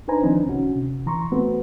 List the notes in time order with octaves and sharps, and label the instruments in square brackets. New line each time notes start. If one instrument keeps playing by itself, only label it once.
[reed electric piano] D4 D#4 B4 C5 G#5 A#5
D#3 F3 C4 D4 D#4
C2 C#4 F#4
C3
E3 A#5 C6 C#6
A3 B3 C4 F#4 B4